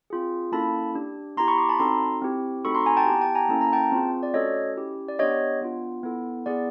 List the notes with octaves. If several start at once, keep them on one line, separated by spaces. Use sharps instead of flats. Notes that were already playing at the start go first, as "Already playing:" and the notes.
C4 F4 G#4
A#3 C#4 E4 A4 A5 B5
D4 G4
B3 E4 G4 A#5 C6
B5 C#6
C6 D6
A5 B5
C4 D#4 F#4 A4 A#5 C6
C4 E4 G4
A3 C4 D#4 F#4 A4 B5 C#6
A#5 C6
G#5 A#5
G5 A5
B3 E4 G4
G5 A5
G#5 A#5
A#3 C#4 E4 A4 A5
A#5
G5 A5
C4 F4 G#4
D5
A3 C#4 F#4 A4 C#5 D#5
C#4 E4 G4
D5
B3 D4 G4 C#5 D#5
B3 D4 F4
B3 E4 A4
B3 E4 G#4 D5